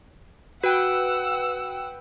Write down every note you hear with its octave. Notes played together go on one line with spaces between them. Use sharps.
F#4 B4 F#5 G5 E6 F#6